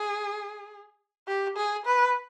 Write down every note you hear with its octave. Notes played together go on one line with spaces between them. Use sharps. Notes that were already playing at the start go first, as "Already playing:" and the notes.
Already playing: G#4
G4
G#4
B4